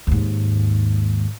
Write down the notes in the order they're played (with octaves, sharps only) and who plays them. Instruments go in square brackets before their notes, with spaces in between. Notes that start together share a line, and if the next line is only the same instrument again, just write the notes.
[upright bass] D#2 G#2